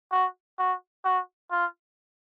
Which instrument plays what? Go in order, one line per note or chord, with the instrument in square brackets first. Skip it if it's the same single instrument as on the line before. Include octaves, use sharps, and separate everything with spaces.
[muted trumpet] F#4
F#4
F#4
F4